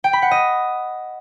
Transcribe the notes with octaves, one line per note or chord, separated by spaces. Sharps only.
G5
B5
F#5
D#5